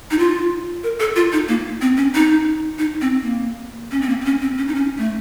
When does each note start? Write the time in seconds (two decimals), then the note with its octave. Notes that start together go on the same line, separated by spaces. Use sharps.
0.11 D#4
0.19 F4
0.83 A#4
1.00 A4
1.16 F4
1.32 D#4
1.48 A#3
1.81 C4
1.97 C#4
2.15 D#4
2.79 D#4
3.01 C4
3.23 A#3
3.91 C#4
4.01 C4
4.09 A#3
4.21 C4
4.25 C#4
4.42 C4
4.58 C#4
4.68 D#4
4.75 C#4
4.98 A3